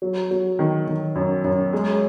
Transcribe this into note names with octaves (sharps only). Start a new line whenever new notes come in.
F#3
F#3
D#3
D#3
F#2
F#2
G#3